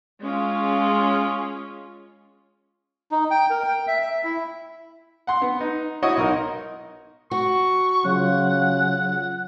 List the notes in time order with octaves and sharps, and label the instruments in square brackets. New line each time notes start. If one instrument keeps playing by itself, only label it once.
[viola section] G#3 C#4 F4
[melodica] D#4
G5
A#4
G5
E5
E5
E4
[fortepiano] F#5 C6
B3
D#4
E4 F#4 C#5 D#5
B1 D#4 A#4
[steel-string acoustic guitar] F#4 [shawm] C#6
[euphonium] C#3 [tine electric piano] F#3 F4 [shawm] F#5